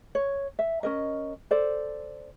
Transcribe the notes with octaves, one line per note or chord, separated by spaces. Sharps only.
C#5
E5
C#4 A#4 D#5
A4 C5 D5